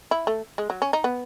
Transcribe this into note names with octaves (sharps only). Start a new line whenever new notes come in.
E4
A3
G#3
F#3
C#4
D#4
B3